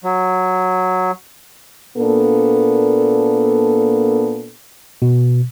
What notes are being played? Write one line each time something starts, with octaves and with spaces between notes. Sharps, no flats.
F#3
A#2 A#3 B3 D4 A4
B2